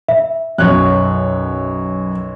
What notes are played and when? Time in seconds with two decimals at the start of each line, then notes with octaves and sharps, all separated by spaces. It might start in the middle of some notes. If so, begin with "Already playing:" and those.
0.09 E5
0.58 B1 F#2 C#5 F#6